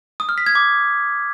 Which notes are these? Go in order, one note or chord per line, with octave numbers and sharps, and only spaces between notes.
D#6
F6
B6
G#6
D6